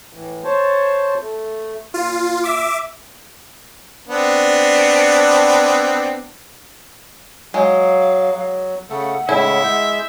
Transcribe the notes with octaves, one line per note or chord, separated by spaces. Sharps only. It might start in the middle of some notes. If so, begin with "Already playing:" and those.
A2 E3
C5 C#5 A5
A3
A#2 F4
E5 D6
B3 C4 D4
F#3 G#3 F5
F#3
C#3 A3 A4 F#5
A2 C#3 G#3 E4 E5
G#3 G6